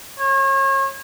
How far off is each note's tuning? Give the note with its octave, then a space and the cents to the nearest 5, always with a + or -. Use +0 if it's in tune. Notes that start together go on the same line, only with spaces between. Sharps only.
C#5 -35